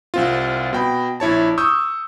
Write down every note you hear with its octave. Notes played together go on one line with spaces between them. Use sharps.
C2 C4 F4
B2 G5 B5
A#1 E4 C#5 A5
C#6 D#6 E6 G6